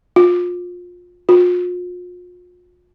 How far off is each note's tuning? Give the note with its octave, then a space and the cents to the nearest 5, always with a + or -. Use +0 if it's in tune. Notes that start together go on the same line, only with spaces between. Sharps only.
F4 +25
F4 +40